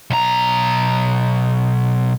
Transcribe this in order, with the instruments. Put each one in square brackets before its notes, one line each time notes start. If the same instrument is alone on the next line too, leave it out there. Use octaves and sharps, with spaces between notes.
[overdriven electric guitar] B1 A#5